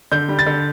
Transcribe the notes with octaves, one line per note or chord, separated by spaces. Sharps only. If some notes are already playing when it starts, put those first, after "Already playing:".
D3 G6
G3
A6
D3